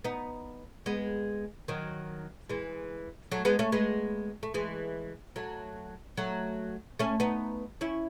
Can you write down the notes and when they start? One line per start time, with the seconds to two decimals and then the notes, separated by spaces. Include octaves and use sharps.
0.04 B3 D#4
0.86 G#3 B3
1.68 D#3 F#3
2.49 E3 G#3
3.32 F#3 A3
3.45 G#3 B3
3.59 A3 C#4
3.72 G#3 B3
4.43 A3
4.54 E3 G#3
5.36 F#3 A3
6.17 F#3 A3
6.99 A3 C#4
7.20 B3 D#4
7.81 C#4 E4